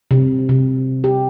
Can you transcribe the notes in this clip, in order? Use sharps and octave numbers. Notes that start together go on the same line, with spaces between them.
C3
C3
G4